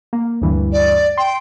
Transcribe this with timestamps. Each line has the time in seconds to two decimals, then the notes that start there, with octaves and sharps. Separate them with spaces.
0.13 A#3
0.42 D2 G2 E3
0.72 D5
1.18 G5 C6